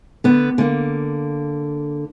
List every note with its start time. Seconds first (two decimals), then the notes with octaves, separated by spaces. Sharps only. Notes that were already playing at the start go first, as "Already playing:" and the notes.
0.24 D3 B3
0.58 D3 A#3